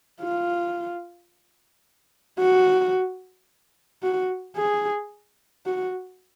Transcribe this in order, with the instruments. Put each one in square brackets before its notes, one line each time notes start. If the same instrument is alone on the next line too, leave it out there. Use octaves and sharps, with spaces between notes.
[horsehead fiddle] F4
F#4
F#4
G#4
F#4